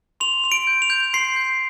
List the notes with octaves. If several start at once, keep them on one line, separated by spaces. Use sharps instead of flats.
C6 F7
C6 F7
D7
G6
F7
G6
C6 C7
G6